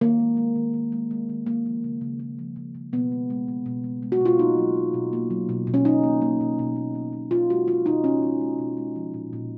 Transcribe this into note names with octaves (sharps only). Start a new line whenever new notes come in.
D#3 A#3
G#3
G#3
D#3
D#3
G#3
G#3
D#3
A#3
F3
C#3
C#3
A#3
F3
C#3
C#3
B2 B3
G#3
G#3
B2
B2
G#3
G#3
F#4
B2 F4
A#3 D#4
F#3
B2
B2
A#3
F#3
B2
B2
C#4
B2 D#4
A#3
A#3
B2
B2
A#3
A#3
B2
B2 F4
G#3 F#4
G#3 F4
B2 D#4
B2 C#4
G#3
G#3
B2
G#3
F3
A#2
A#2